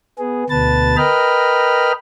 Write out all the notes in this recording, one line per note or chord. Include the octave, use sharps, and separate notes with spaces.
B3 G#4
D2 B2 B4 A5 A6
A#4 B4 D#5 G5 B5 F6